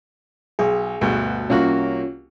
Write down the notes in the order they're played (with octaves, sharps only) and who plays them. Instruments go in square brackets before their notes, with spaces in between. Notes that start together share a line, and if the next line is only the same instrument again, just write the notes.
[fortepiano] B1 [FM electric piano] G#4
[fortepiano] D2 G2 B2
[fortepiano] C2 A#3 F#4 [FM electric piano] C#4 F4